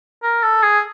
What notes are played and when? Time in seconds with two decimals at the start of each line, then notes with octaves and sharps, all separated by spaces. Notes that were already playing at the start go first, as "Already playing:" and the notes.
0.23 A#4
0.43 A4
0.63 G#4